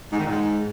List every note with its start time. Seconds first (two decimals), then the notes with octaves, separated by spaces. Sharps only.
0.13 G#2
0.19 D#3
0.24 A#2
0.30 G#2